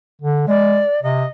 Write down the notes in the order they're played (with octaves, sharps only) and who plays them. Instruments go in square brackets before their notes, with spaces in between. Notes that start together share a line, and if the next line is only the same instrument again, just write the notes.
[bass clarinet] D3
[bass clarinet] G#3 [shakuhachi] D5
[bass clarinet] C3 [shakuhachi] D#5